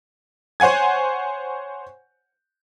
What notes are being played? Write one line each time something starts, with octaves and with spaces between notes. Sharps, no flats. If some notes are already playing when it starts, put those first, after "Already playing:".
C5 C#5 F#5 G#5 G#6